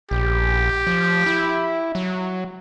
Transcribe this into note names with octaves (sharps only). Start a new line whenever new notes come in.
A#1 G4
F3
E4
F#3